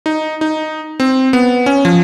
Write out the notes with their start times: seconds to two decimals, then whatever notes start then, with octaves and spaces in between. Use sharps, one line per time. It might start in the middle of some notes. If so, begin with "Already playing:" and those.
0.06 D#4
0.41 D#4
1.00 C4
1.33 B3
1.66 C#4
1.85 F3